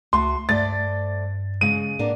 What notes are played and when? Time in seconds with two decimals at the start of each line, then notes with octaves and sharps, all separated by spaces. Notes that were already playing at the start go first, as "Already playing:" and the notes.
0.13 C#2 A3 F#4 C6
0.49 G2 A3 C5 D5 A6
1.61 C#3 G#3 D#7
1.99 A2 A#3 B3 D4